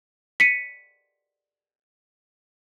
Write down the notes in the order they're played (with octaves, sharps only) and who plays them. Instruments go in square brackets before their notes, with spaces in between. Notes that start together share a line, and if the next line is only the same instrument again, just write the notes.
[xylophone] B6 C#7 D#7